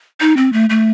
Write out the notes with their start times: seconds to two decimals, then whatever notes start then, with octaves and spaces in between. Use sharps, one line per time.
0.20 D#4
0.37 C4
0.53 A3
0.70 A3